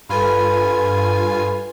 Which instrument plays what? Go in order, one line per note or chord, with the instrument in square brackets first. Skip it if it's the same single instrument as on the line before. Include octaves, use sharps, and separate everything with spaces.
[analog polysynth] G2 F4 G#5 [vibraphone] A4 B4 B5